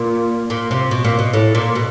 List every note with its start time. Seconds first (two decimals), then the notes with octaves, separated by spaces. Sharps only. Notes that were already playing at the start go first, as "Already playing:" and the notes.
Already playing: A#2
0.50 A#2
0.71 C3
0.91 B2
1.04 A#2
1.19 B2
1.33 A2
1.55 A#2
1.75 B2